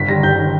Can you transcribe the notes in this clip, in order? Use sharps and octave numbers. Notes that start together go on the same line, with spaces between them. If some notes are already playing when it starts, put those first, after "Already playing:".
Already playing: G1 B6
G2 D#3 A#6
G1 G6
D#3